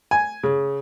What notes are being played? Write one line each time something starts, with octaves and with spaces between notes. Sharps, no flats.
G#5
C#3